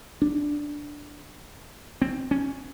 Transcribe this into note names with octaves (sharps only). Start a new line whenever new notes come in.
D4
C4
C#4